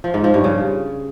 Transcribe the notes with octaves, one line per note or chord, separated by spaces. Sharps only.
F3
G#2
F3
G2
C#3